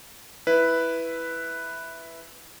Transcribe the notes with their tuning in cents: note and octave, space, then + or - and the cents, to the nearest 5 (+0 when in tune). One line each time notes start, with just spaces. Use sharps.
E4 +0 B4 +0